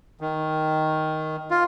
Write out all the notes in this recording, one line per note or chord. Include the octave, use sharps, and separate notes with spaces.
D#3
F4